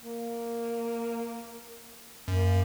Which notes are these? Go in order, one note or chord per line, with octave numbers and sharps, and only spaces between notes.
A#3
F#2 A#3